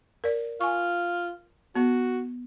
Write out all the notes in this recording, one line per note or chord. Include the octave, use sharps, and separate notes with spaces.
A#4 D5
F4 G#5 C#6
B3 F#4